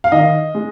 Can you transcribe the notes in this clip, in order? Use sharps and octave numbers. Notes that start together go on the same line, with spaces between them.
F5
D#3 D#5
G#3